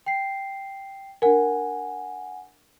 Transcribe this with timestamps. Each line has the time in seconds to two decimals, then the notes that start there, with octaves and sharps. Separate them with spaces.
0.06 G5 C7
1.22 D4 A#4 F#5 G#5